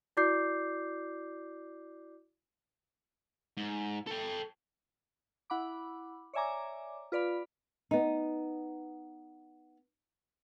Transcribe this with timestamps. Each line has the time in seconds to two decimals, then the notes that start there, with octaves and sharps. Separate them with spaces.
0.17 E4 F#4 D5 D6 G6 C7
3.57 G#2
4.07 A4 G5
5.50 E4 F#5 B5 D6
6.33 C#5 D5 E5 G#5 A#5 D6
7.12 F4 B4 D5 F5 B5
7.91 B3 D#4